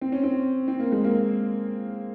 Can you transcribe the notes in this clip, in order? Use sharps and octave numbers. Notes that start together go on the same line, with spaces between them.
C4
C#4
C4
C4
A#3
G#3
A#3